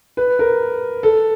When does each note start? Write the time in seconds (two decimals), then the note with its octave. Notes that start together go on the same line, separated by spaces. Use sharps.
0.17 B4
0.39 A#4
1.03 A4